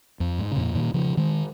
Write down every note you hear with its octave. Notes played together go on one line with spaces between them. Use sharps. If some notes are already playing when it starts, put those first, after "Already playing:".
F2
G#2
C#3
F2 A#2
A#2 D#3
C#3 F3
D#3 G#3